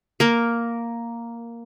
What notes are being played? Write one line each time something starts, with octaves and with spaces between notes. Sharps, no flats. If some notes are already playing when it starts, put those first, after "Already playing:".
A#3 A#4